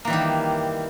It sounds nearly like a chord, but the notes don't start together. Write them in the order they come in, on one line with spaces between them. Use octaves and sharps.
A#3 E3 G3 D#3